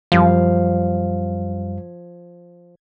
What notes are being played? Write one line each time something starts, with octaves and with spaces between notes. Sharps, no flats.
F#2 F3 G3 F5